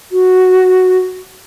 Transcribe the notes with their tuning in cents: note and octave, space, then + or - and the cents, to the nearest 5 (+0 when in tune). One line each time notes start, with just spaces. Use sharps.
F#4 +0